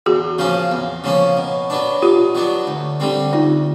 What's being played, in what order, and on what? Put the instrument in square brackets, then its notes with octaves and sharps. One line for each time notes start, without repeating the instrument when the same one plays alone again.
[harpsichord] E2 [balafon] F#4 G#4
[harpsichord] C#3 F3 A#3 C#4
E2
C#3 F3 A#3 C#4
B2
F#3 B3 D4
[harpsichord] B2 [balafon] F4 G4
[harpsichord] F#3 B3 D4
D2
D3 G3 C4
[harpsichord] D2 [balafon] D#4 F4